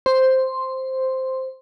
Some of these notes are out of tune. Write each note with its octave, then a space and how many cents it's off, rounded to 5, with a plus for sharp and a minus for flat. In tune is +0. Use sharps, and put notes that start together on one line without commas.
C5 +0 C6 +0